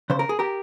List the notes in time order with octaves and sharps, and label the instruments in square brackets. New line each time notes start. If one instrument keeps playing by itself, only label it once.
[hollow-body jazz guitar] C#3 C5
A#4
G#4
G4 A#4